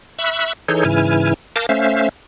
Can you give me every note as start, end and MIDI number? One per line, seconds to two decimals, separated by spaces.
0.19 0.53 76
0.19 0.53 83
0.19 0.53 85
0.19 0.53 88
0.19 0.53 90
0.68 0.84 52
0.68 0.84 63
0.68 0.84 68
0.68 0.84 69
0.68 0.84 73
0.68 0.84 91
0.85 1.34 44
0.85 1.34 49
0.85 1.34 52
0.85 1.34 64
0.85 1.34 80
0.85 1.34 89
1.56 1.66 70
1.56 1.66 77
1.56 1.66 81
1.56 1.66 86
1.56 1.66 91
1.56 1.66 94
1.69 2.09 57
1.69 2.09 61
1.69 2.09 72
1.69 2.09 76
1.69 2.09 77